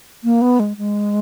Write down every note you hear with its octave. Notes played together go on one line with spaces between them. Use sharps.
A#3
B3
G#3
G#3